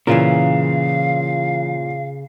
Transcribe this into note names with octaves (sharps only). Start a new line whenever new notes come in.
A#2 C#3 E3 F4 A#4 F5